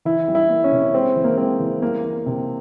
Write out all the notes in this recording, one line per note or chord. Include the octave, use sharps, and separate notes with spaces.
E3 E4
G3
E4
A#3
C#4
C3
G#3 C4
E3
A#3
G#3 C4
E3
G3 A#3
A#3
C3